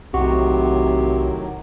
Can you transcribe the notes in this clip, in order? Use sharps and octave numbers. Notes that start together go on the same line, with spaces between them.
B1 A2 C3 D#3 F#3 F#4